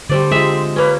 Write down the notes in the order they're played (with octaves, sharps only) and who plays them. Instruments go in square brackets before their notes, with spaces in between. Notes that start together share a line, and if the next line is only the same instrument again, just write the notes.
[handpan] D3 C5 [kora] G3 A3 D5
[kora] G#3 C4 E5 [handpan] F4 G4
[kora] A#3 C#4 [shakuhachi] B4